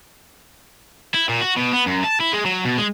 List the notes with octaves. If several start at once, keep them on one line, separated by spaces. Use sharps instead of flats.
E4
A#2
F#4
B2
B3
F#2
A5
E4
G#3
F#3
B2
G#3